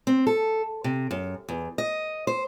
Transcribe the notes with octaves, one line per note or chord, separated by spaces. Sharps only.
C4
A4
C3
F#2
E2
D#5
C5